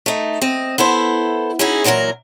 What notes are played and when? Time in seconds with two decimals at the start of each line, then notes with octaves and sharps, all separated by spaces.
0.06 A3 D#4
0.41 C4 D#5
0.78 B3 E4 A4 C5
1.59 C#4 D#4 E4 F#4 G#4
1.84 A#2 E3 F#3 A4 A#4